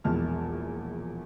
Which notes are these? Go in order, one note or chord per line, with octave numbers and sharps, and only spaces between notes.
E1 A#1 E2 A5 F6